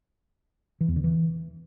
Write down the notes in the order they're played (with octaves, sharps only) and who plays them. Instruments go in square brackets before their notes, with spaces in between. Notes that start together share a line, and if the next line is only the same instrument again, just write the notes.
[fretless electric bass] E3
E2
D3
E3